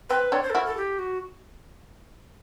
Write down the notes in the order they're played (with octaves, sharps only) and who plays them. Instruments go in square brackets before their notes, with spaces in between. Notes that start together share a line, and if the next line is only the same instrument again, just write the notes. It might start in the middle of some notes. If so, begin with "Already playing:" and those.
[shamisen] C4 [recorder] B4
[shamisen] C4 D4 [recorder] C#5
[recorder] C5
A4
[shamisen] E4 F#4 [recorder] A#4
[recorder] A4
G4
F#4